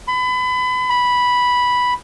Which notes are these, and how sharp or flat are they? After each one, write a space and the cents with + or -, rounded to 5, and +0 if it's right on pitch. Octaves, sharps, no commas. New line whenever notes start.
B5 +30
B5 -5